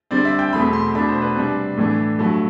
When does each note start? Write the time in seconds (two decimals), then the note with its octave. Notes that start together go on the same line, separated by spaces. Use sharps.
0.11 D3 G3 C4 D5
0.25 E5
0.39 G5
0.53 E2 B2 A3 C4 B5
0.73 C6
0.95 B2 A3 D4 B5
1.08 C5
1.22 B4
1.36 C3 G3 D4
1.77 A2 E3 A3 D4
2.19 G2 F#3 A3